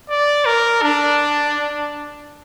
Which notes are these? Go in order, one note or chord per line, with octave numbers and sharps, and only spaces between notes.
D5
A#4
D4